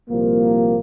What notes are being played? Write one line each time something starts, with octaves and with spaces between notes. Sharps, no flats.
C2 A#2 F3 A#3